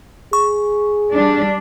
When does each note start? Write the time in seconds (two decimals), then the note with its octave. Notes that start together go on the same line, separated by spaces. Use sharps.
0.33 G#4 C#6
1.12 G3 D4